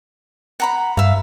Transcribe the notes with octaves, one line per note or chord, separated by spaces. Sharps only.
F#5 A#5 B5
G2 E5 F5